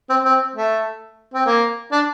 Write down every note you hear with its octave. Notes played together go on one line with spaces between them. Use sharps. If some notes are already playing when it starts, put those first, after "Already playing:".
C4
C4
A3
C4
A#3
D4